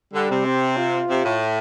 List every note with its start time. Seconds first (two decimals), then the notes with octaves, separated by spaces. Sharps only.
0.14 D3 G3
0.30 C3
0.45 C4
0.77 F4
1.09 C3
1.25 A2